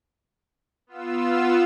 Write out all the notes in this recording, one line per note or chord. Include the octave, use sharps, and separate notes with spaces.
B3 F4 E6